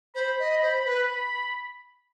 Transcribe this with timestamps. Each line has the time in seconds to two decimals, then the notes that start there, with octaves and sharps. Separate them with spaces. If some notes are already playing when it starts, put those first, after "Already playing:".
0.15 C5 B5
0.39 D#5
0.63 C5
0.85 B4